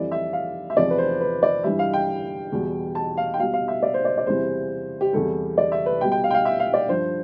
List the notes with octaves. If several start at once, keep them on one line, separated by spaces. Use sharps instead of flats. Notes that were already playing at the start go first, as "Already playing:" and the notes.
Already playing: F2 E3 G3 D5
E5
F5
E5
E2 C3 F3 D5
B4
C5
B4
D5
G2 E3 G3 E5
F5
G5
E2 B2 G3
A5
F5
G5
B2 G3 F5
F5
E5
D5
C5
D5
D5
E2 C3 E3 G3 C5
G4
E2 C3 G3 A4
D5
E5
B4
B2 G3 G5
G5
F5
G5
F5
E5
F5
D5
G2 F3 C5